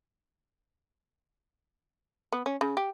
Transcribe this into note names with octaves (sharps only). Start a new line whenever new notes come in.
B3
C#4
C#3
G4